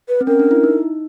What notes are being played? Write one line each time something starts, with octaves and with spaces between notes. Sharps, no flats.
B4
C4
C#4 A#4
D4
E4
D#4